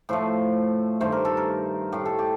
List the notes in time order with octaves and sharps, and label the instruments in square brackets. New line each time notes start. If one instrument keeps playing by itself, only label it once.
[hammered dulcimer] A2 F3 A3 C5
G2 D#3 A3 C5
A#4
A4
A#4
A2 A3 G4
A4
G4